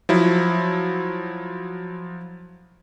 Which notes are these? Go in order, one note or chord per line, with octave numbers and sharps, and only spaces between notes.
F3 F#3 E4